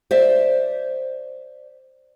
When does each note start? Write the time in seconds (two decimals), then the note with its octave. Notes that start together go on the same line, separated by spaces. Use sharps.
0.11 C5 D5 E5